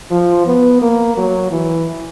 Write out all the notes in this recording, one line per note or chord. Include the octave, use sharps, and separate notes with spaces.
F3
B3
A#3
F#3
E3